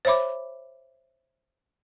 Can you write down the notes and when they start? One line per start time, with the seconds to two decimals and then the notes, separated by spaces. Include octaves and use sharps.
0.05 C5 C#5 E5 B5 D6